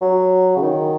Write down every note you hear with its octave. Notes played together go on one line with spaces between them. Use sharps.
F#3
C#3
D#3